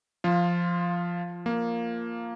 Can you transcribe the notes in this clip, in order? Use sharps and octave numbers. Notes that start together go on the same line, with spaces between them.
F3 F4
A#3